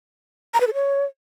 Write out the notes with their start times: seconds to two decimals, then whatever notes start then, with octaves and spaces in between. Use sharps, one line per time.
0.54 A#5
0.61 B4
0.67 A4
0.74 C#5